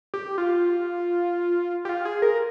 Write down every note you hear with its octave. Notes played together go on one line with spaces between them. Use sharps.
G4
F4
G4
F4
G#4
A#4